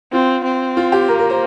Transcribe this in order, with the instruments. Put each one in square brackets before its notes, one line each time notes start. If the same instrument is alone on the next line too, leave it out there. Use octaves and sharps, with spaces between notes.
[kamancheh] C4 [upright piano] F4
[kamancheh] C4
[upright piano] F4
G4
[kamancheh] A#3 [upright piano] A#4
[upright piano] A#4
C5